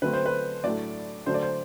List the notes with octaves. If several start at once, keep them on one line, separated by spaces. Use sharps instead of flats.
D3 F#3 A3 C4 B4
C5
B4
A2 F#3 A3 D4 D5
D3 F#3 A3 D4 C5
D5
C5